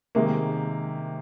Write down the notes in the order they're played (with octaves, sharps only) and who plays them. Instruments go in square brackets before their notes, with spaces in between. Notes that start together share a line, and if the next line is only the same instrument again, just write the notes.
[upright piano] C3 D#3 G#3 A#3